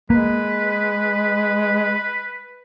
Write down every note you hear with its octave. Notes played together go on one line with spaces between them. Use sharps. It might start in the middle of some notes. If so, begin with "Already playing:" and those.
G#3 A#3 B4